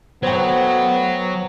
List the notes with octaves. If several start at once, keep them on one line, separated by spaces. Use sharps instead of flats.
F#3 A3 B3 F#4 C5 G5